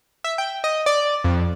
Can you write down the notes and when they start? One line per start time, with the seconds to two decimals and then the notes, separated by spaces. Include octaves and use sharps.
0.24 E5
0.38 G5
0.64 D#5
0.86 D5
1.24 F2